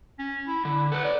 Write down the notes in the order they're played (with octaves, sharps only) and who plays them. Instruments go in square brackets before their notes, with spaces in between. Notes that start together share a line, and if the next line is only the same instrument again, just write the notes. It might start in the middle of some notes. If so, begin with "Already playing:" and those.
[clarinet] C#4
E4
[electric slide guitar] D3 [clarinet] E4
[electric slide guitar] A4 B4 [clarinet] F#5
[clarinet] D5